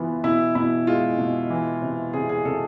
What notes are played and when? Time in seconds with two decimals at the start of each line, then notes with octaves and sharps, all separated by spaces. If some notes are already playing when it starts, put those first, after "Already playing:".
Already playing: C3 E3 B3 F4
0.24 B2 E4
0.55 B2 E4
0.87 G#3 F4
1.19 B2
1.50 E3
1.82 C3
2.13 C3 G#4
2.29 G#4
2.45 C3 A4